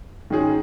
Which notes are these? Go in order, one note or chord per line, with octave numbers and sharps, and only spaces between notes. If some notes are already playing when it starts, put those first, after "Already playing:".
G#2 D#3 G#3 C#4 G#4